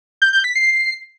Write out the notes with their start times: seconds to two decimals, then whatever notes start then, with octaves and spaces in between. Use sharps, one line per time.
0.22 G6
0.33 G6
0.44 B6
0.56 C7